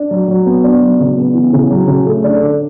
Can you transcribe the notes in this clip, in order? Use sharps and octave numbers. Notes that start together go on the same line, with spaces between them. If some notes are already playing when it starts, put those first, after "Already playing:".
Already playing: D4
F#3
F#3
B3
D4
F#3
C#3
B3
E3
C#3
F#3
C#3
A3
D4
D3